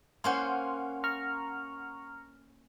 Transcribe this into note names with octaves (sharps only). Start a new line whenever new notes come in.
A#3 C#4 C5 F#5 C6
A#5 C#6 F6